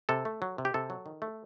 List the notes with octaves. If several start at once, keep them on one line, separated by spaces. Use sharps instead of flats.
C3 A4
A3
F#3
C3
G4
C3 A4
F#3
D#3
A3